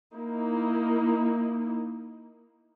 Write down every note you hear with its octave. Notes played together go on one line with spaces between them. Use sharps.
A#3 D#4 E4